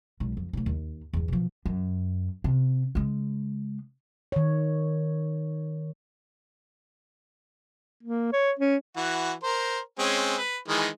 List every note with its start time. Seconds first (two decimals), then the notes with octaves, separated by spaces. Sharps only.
0.20 B1 G#3
0.37 F2
0.53 B1 A3
0.66 D#2
1.13 E2 G2
1.28 B2 F3
1.66 F#2
2.44 C3
2.95 C#3 G#3
4.32 D#3 C#5
8.03 A#3
8.33 C#5
8.59 C#4
8.97 E3 F#4
9.43 A#4 C5
9.99 G#3 C4 C#4
10.38 B4
10.68 D#3 E3 G#3